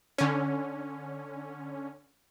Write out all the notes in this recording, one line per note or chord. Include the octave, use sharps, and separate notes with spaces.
D3 C#4